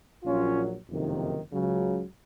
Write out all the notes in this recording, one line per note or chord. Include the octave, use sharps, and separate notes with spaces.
A#1 A#2 F#3 C#4 F4
F#1 F2 C3 D#3
C#2 C#3 F#3